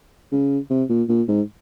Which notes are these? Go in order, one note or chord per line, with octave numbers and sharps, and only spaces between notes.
C#3
C3
A#2
A#2
G#2